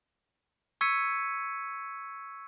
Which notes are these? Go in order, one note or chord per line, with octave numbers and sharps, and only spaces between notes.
C#6 E6 G#6 B6 C#7 D#7